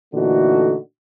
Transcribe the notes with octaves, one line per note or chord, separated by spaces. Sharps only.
A#2 D3 E3 A3 D#4 F#4